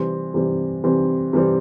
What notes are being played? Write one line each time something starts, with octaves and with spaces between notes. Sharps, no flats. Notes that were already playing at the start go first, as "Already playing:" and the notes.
Already playing: C3 E3 G3 C4
C3 E3 G3 C4
C3 E3 G3 C4
C3 E3 G3 C4